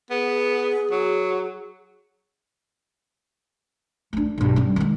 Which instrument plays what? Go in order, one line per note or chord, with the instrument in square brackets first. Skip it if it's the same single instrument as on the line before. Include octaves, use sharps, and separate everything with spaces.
[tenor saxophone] B3 [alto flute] G#4
[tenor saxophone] F#3
[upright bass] A3 D4
B1 G2
G3 C#4
D#3 G#3